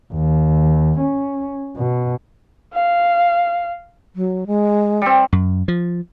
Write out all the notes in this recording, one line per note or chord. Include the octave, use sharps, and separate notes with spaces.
D#2
C#4
B2
F5
F#3
G#3
G3 C4
F#2
F3